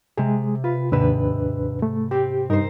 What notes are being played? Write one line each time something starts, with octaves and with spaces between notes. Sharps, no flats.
C3 G#3 G#4
F4 B4
D#2 G#2 C3 D4 B4 E6
A3
C4 G4
G2 D#4 A#4 C5